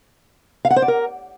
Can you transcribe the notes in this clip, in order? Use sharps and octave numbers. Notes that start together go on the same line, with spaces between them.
F5
F#5
C5
D5
A#4